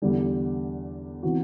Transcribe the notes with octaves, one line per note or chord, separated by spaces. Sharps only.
E2 D3 G3
C3 E3 B3 F#4